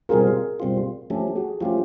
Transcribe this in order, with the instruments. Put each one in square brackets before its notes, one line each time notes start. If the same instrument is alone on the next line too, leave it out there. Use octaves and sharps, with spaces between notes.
[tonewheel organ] B2 G3 C4 F4 [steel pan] G#4 A#4
[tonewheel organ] B2 G3 C4 F4
[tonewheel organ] F3 A3 C#4 [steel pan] G4 A4
[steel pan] F#4 G#4
[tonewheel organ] F3 A3 C#4 [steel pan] F4 G4